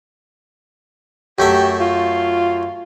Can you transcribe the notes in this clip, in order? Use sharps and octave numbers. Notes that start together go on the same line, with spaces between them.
F#2 A3 G4 E5
F4